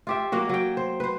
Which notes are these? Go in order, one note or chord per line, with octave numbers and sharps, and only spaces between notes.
F4 G4 E5
F#3 A#3 F#4
F#3 G5
C5
B4 C5